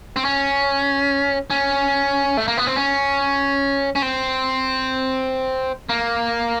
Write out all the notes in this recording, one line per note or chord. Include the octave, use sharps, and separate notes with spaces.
C4
C#4
C#4
A3
A#3
B3
C4
C#4
C#4
C4
A#3